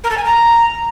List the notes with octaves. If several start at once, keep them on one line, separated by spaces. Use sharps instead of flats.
A#4
A4
G#5
A#5